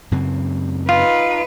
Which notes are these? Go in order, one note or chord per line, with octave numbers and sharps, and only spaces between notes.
F#2 C#3 C4
D#4 F4 B4 F5